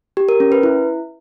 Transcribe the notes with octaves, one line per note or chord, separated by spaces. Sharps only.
G4
A#4
C#4
B4
E4